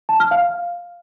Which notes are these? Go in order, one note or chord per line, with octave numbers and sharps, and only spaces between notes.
A5
F6
F5